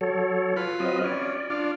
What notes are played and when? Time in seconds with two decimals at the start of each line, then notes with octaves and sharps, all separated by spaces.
0.01 F#3 A4 C#5
0.56 F4 B4
0.80 F#3 C4 D#5
1.04 C#4 D5
1.50 D4 F4